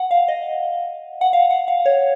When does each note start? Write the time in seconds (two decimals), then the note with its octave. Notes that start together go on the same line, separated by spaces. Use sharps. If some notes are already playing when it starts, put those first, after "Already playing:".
Already playing: F#5
0.11 F5
0.28 D#5
1.21 F#5
1.33 F5
1.50 F#5
1.68 F5
1.86 C#5